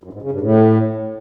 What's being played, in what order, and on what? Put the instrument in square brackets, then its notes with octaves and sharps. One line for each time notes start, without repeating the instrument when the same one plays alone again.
[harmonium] F#2
G#2
C#3
G2
A2